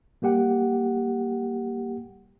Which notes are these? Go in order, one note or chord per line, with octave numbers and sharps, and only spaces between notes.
G3 A#3 G4 F#5 G5